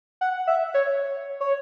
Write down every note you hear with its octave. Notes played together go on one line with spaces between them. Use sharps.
F#5
E5
C#5
C#5